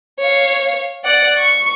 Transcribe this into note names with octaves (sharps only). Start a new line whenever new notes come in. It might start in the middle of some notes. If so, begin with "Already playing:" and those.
C#5 F5
D5 F#5
C#6